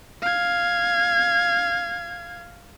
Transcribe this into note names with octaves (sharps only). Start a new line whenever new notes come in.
F5 G#6